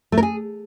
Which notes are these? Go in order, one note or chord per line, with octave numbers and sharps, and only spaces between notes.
A3
A#4
G#4